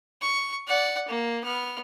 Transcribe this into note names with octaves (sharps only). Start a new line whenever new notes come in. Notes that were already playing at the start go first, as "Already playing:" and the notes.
C#6
D5 F#5
A#3
B3 F6